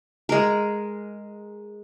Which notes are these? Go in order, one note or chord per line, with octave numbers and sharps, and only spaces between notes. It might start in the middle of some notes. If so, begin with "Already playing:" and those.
G#3 A#4